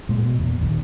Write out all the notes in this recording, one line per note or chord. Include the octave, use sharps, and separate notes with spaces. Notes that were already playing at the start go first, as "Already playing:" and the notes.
A#2 G#3
B2
E2 A#2
D#1 A#1 D#2